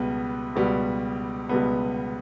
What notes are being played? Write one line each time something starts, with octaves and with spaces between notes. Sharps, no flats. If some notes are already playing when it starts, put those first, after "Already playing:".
Already playing: C#2 B2 G3 B3
C#2 B2 G3 B3
C#2 B2 G3 B3